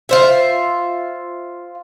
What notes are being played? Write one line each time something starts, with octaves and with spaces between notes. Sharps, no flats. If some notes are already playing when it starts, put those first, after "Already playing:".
F4 C5 E5